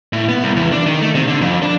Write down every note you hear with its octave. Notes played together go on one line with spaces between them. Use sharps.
A2
B3
C2
E2
D4
D#3
A3
C3
D3
F2
D4